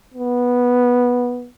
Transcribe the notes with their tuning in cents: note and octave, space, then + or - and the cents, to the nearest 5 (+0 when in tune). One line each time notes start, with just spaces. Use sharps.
B3 -10